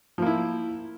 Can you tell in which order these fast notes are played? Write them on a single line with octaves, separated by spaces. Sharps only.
F3 A#3 E4